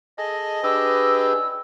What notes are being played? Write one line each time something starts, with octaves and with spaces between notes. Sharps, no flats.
G#4 A4 D#5
D4 G4 G#4 B4 E6